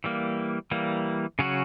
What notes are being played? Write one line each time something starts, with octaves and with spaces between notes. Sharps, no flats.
E3 G3 A#3
E3 G3 A#3
C#3 F#3 C#4 F#4